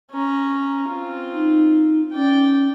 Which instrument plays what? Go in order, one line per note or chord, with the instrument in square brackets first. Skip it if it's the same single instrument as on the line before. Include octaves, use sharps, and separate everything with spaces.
[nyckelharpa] C#4 A#5
C4 F4
[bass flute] D#4
[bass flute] C#4 [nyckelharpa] D5 G5